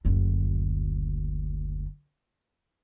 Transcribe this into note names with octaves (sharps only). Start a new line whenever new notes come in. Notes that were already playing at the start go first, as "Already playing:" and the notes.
F#1 D2